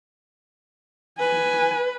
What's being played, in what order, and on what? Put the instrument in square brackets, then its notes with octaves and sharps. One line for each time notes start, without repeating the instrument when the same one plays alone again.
[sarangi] B4 [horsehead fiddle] G#5